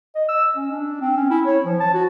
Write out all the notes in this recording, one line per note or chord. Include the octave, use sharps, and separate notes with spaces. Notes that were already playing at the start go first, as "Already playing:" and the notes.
D#5
E6
C#4
D4
C4
C#4
E4
C#5
F3
A5
F#4